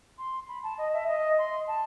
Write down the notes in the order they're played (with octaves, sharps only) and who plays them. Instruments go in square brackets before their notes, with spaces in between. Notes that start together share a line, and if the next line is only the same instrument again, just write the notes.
[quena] C6
B5
A5
D#5
E5
D#5
C6
A5